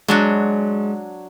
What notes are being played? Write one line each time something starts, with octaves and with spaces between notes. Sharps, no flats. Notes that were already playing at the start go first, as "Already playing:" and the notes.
F#3 G#3 D4 F#4